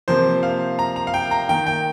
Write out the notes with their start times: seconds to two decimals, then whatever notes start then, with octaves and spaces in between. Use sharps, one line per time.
0.08 C3 F3 A#3 C5
0.43 F5
0.79 A#5
0.96 A#5
1.07 F5
1.14 G5
1.31 A#5
1.49 D#3 A#3 G5
1.67 G5